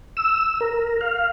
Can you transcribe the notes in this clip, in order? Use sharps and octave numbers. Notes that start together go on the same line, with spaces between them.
E6
A#4
F5